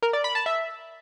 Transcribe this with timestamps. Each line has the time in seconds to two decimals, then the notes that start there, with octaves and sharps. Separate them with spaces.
0.02 A#4
0.13 D5
0.24 B5
0.35 A5
0.46 E5